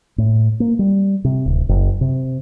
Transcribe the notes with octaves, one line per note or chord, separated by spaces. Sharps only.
A2
A#3
G3
C3
D1
F#1
C3